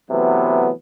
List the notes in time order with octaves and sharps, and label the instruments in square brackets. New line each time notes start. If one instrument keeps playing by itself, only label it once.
[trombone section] C3 E3 F#3 A3 B3